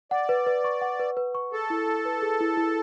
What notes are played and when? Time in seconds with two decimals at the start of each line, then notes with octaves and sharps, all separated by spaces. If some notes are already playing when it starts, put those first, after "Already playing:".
0.11 D5 F#5
0.29 B4
0.47 B4
0.64 C#6
0.81 F#5
1.00 B4
1.17 B4
1.35 C#6
1.52 G#4 A4
1.70 E4
1.88 E4
2.05 B4
2.22 G#4
2.41 E4
2.57 E4